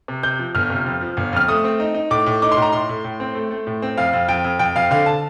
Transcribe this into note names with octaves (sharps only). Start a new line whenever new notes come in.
C3
C3 G6
F3
G1 F6
C3
F2
F3
G1
F2 F6
A3 D#6
C4
D#4
D#4
A2 D6
A2
D#4 D6
C6
A2
A#5
A2 C6
A2
A2
C4
A3
A3
A2
C4
F2 F5
F2
F2 G5
F2
F2 G5
F2 F5
D3 F5
A5